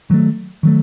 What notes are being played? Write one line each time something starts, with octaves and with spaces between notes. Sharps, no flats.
D#3 F#3 A3
D#3 F#3 A3